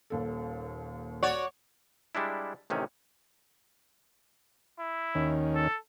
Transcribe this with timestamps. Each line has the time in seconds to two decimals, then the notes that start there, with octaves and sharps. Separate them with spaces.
0.10 D#1 D#2 A4
1.23 F#4 C#5 D5
2.15 G3 G#3 D4 E4
2.70 A1 C3 D#3 C#4
4.80 E4
5.15 D#2 D#3 C#4
5.55 A4